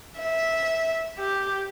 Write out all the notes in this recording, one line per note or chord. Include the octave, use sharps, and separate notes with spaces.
E5
G4